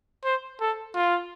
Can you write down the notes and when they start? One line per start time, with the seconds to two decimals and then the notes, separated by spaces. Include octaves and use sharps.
0.24 C5
0.61 A4
0.95 F4